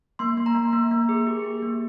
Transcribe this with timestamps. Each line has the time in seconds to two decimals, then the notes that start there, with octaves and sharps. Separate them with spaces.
0.19 A#3 C6
0.37 A#3
0.46 A#5
0.55 A#3
0.73 A#3
0.91 A#3
1.09 G#4
1.27 G4
1.44 G4
1.63 A#3